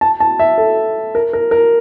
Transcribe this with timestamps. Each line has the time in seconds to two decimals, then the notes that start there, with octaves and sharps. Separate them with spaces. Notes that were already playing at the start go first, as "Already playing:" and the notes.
0.01 A5
0.20 A5
0.39 E5
0.58 A4
1.15 A#4
1.33 A#4
1.51 A#4